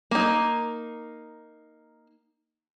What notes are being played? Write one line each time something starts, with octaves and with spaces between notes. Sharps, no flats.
A#3 D#4